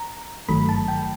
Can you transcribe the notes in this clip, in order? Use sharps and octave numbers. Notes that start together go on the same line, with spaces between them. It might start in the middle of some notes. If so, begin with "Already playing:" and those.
Already playing: A#5
G#1 G2 D#3 F#3 A3 B5
A5
G5